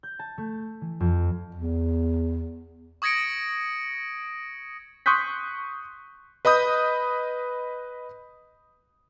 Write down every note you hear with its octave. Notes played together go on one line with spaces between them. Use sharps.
G6
A5
A3
E3
F2
E2
C#6 D#6 G#6 A#6 C#7 D7
C6 C#6 D#6 F#6 G6 B6
B4 D#5 B5 D#6 G6